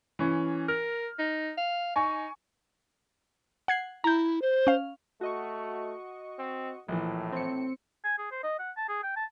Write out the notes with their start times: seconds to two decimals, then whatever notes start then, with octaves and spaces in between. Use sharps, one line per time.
0.19 E3 C#4
0.68 A#4 F6
1.19 D#4
1.57 F5
1.96 D#4 G#5 C#6
3.68 F#5 G#6 C7
4.04 E4 A#5 G6
4.42 C5
4.67 C#4 F5
5.21 A3 F#4 D#5 C#6
6.39 C4
6.88 A#1 A2 E3
7.32 C4 C#7
8.05 G#5
8.19 G#4
8.32 C5
8.44 D#5
8.59 F#5
8.77 A5
8.89 G#4
9.03 G5
9.17 A5